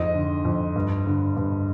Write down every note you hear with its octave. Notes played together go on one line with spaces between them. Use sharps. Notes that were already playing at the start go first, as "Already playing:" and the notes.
Already playing: F2 G#2 D#5
D3
F2
G2
D3
G2